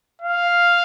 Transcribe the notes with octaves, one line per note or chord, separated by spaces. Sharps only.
F5